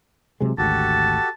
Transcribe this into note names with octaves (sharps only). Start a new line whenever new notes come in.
C3 F#3 G#3
G#1 D2 F#4 G4 A4 A5